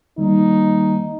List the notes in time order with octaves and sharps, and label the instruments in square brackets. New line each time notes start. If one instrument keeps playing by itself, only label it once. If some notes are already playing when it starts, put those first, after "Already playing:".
[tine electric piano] D#3 G3 A#3 [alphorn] D#4